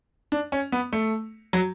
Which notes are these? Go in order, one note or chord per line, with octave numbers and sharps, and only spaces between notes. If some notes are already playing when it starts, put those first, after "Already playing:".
D4
C#4
B3
A3
F#3